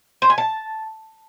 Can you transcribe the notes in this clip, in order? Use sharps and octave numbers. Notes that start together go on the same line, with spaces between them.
C5
G#5
A5